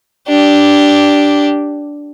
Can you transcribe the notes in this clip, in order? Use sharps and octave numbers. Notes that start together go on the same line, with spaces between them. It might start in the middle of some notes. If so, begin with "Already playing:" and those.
D4 G4